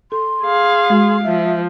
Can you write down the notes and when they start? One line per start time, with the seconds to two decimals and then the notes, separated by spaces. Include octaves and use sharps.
0.12 A4 C6
0.43 G#4 F5
0.90 G#3 F#4
1.24 F3 E5